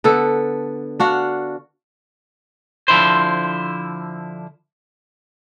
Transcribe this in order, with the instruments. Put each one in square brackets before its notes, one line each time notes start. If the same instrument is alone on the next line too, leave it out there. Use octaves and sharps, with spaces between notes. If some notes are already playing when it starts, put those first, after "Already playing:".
[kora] D3 B3 A4
D4 F#4 F5
[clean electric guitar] D3 F3 E4 C5